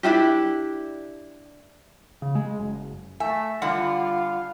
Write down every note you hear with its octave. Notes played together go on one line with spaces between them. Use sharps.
D4 E4 F4 G4
C#3
G#3
F#1
A3 E5 G#5
D3 G3 F4 F5 F#5